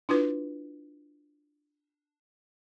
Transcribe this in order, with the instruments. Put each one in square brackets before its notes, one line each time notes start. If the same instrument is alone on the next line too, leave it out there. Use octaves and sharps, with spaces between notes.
[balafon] D4 E4 F4 B4